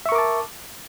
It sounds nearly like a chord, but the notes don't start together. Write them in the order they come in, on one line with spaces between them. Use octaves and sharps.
E5 C#6 A#4 D6 A5